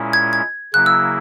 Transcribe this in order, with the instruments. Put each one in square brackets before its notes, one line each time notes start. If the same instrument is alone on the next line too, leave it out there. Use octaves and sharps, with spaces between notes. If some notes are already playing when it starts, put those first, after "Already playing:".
Already playing: [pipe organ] A#2 G#3 C#4 E4
[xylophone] G#6
G#6
[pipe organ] C#3 F#3 A#3 E4 [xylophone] F#6
[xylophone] E6